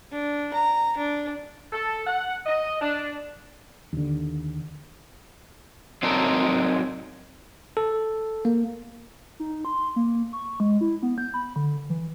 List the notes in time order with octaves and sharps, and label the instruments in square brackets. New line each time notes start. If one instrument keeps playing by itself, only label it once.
[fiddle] D4
A#5
D4
[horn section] A4
F#5
D#5
D4
[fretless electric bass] D#2 D3
[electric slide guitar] F#3 C4 D#4 A4 A#4 D5
[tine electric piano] A4
A#3
[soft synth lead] D#4
C6
A#3
C#6
G#3
E4
B3
G6
B5
D3
E3